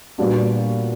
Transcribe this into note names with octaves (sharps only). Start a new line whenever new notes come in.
A#2 G3 B3 D4 F#4